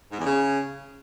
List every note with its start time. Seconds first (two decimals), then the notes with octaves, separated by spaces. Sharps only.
0.10 G#2
0.18 E2
0.25 C#3